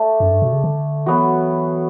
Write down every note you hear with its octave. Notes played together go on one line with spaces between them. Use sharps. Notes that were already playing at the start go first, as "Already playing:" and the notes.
Already playing: A3 D4
F#2
G2
B2
C#3
D3
E3 F#3 B3 F#4